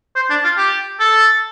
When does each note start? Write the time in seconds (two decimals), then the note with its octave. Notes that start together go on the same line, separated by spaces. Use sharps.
0.16 C5
0.30 D4
0.44 F4
0.58 G4
1.00 A4